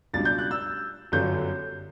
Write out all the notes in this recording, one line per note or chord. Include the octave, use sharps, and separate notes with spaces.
C#2 B2 G3 D4 A6
G6
F#6
E6
G1 F#2 D3 G3 G6